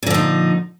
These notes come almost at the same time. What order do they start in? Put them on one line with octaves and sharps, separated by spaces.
A#2 D3 F3 D#4